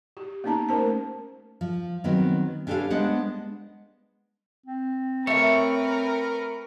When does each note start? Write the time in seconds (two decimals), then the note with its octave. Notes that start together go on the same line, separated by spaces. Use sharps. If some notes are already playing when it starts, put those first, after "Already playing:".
0.17 G4
0.44 A#3 B3 C#4 D#4 A5 A#5
0.69 A3 C#4 A#4 C5 A5
1.61 F3
2.04 D#3 F#3 B3 C4
2.67 C#4 D4 G4 A4 B4 F5
2.90 G#3 B3 D4 C5 F#5
4.66 C4
5.27 A3 A#4 B4 C#5 E5